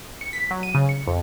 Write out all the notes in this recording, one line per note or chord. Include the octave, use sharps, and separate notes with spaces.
C#7
B6
F#3
D#7
C#3
C#7
F2